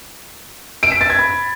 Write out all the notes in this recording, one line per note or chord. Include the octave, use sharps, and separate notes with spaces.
D7
B6
A6
G#6
B5